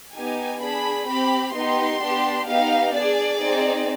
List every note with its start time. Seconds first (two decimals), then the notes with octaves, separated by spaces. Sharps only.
0.15 B3 D#4 G4 G#5
0.62 D4 G#4 B5
1.08 C4 G4 B5
1.55 B3 D#4 G4 C6
2.02 B3 D4 G4
2.48 B3 D#4 G4 F5
2.94 D4 G#4 D5
3.41 C4 D#4 G#4